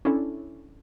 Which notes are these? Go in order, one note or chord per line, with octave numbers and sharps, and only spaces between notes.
C#4 D4 E4 A4